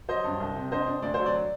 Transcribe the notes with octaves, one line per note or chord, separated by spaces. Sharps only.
F#3 C5 D#5
G2
C2
C3
D4 C5 D#5
D4
D2 D5
F#3 C5
D5